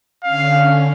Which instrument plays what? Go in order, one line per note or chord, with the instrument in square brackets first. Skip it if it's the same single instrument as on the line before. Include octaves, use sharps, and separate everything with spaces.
[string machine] D3 C#4 [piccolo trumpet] F5